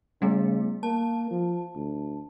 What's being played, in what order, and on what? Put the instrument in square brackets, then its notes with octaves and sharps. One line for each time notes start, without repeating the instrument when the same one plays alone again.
[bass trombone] C#3 [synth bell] G3 A3 B3
[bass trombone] A#3 [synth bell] A5
[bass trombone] F3
D2